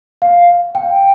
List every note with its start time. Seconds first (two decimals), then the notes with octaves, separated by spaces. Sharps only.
0.22 F5
0.75 G5